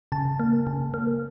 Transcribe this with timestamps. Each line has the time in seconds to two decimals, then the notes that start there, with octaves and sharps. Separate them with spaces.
0.12 C#3 A5
0.40 A#3
0.67 C#3
0.94 A#3